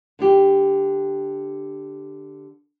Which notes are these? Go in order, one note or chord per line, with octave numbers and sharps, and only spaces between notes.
D3 D4 G4